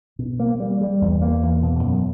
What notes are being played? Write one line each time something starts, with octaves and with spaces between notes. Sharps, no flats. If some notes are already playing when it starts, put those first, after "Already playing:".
B2
A#3
G3
G3
E2
A#3
E2
B2
F#2